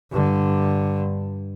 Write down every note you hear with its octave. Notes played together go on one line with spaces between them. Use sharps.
G2 D3